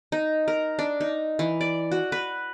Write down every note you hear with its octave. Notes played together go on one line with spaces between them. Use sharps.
D#4
A#4
D4
D#4
E3
D5
F#4
B4